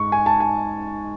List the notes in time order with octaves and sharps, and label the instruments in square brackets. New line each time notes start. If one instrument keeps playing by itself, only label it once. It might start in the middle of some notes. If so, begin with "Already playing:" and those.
Already playing: [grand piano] G#2 G#3 C#6
G#5
A5
G#5